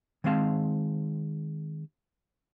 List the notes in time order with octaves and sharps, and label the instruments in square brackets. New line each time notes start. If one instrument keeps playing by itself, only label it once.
[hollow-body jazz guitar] D#3 G#3 C4 F5 A5